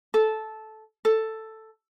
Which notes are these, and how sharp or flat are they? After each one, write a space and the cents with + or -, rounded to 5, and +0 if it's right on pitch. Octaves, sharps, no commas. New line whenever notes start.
A4 -10
A4 +5